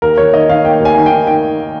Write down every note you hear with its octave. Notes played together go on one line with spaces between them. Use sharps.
D#2 A#4
D#2 C#5
D#3 D#5
D#3 F5
A#3 G5
D#2
G#5
D#3
D#3 G5
D#3 G5